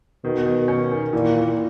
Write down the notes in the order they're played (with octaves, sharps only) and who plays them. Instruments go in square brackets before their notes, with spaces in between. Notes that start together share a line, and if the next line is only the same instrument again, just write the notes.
[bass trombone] B2 [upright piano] D#3
[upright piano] D#3
C#4
D#3
[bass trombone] A#2 [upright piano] E3
[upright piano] A#3